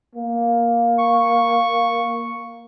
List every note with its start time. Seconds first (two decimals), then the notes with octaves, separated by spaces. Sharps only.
0.15 A#3
0.99 C#6